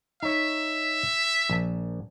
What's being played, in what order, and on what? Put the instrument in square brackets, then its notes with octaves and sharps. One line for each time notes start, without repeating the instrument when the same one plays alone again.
[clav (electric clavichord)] D#4 C#5 [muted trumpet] E5
[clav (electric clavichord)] A#1 A5